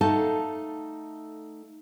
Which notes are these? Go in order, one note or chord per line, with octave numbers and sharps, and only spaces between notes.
A3 D#4 A4 F5 F#5 A5